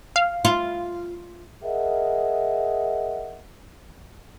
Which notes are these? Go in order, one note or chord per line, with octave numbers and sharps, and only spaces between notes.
F5
F4
G#4 A#4 D#5 E5 F#5